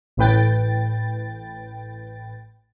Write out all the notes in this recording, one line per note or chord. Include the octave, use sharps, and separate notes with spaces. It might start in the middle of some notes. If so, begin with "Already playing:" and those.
A1 A2 B4 G5 A6